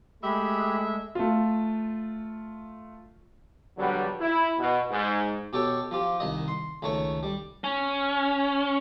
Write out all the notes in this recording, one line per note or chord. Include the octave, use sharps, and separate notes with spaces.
G#3 A3 G4 E5 B5
A3 F4
A#1 D3 F#3 G3 B3
E4
B2
G#2
B2 G4 A4 C#5 G5
F3 F4 G4
C2 D#3 D#5
C6
C#2 D#3 A3 C#5 C#6
G3
C#4